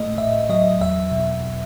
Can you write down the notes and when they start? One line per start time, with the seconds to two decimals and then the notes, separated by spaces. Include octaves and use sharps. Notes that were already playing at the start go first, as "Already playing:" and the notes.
Already playing: A2 A3 D#5
0.17 A2 E5
0.49 F#3 D#5
0.81 E2 E5
1.12 B2